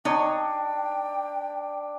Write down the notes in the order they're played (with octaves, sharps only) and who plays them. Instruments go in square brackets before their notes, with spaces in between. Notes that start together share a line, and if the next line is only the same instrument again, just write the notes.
[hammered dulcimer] D4 [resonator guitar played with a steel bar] D#4 C#5 [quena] G5